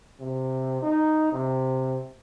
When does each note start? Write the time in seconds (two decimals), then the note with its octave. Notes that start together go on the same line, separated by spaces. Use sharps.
0.20 C3
0.82 D#4
1.33 C3